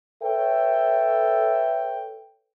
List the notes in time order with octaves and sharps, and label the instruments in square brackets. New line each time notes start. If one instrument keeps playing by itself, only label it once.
[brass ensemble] A4 B4 C#5 E5 G5